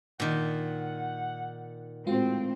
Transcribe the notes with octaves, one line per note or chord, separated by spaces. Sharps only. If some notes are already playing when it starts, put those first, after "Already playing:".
A#2 D#3 F#5
A2 G#3 C4 F4 F#4